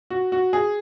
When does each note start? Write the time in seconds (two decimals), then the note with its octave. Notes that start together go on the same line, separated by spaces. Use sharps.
0.10 F#4
0.32 F#4
0.53 G#4